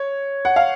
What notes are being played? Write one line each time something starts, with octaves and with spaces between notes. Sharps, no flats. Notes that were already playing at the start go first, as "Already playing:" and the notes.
Already playing: C#5
F#5
F5